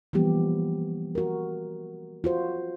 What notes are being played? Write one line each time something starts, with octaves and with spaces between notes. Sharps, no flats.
E3 F3 G3 A#3 B3 G4
F#4 A#4
F4 F#4 C5